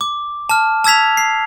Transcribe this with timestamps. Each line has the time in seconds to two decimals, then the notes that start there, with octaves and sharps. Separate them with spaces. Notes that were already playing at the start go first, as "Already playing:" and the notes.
0.01 D6
0.49 A5 F6
0.84 A5 E6 G#6 B6 F7
1.17 C7